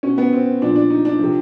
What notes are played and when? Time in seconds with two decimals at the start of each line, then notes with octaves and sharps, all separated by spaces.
0.03 B2 C#4
0.18 B3
0.33 C4
0.62 A#2 F3 D4
0.76 D4
0.90 D#4
1.05 D4
1.19 C3 F3